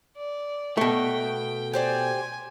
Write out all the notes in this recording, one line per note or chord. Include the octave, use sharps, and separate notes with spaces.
D5
B2 A3 G5
G4 C5 D5 G#5